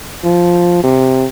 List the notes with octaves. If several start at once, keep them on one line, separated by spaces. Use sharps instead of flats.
F3
C3